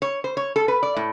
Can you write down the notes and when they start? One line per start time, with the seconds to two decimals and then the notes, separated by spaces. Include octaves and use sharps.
0.02 C#5
0.24 C5
0.37 C#5
0.56 A4
0.68 B4
0.83 D5
0.97 A2